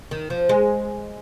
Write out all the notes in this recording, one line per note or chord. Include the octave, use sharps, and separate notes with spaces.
D#3
F3
G#3